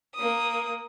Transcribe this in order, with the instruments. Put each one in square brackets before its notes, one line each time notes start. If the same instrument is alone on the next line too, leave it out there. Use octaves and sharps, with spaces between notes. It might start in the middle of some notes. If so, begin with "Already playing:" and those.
[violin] A#3 D#6